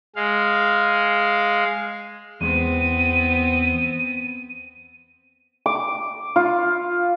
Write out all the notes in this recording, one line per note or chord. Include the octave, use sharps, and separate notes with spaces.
G#3 F5
E2 G#3 B3 C4 D#7
D6
F4